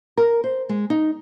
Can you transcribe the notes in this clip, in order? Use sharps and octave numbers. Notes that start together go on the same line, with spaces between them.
A#4
C5
G#3
D#4